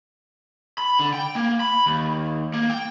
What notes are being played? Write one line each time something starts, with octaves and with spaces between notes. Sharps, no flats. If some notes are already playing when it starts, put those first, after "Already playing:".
B5
D3
G5
A#3
B5
D#2
A#3
G5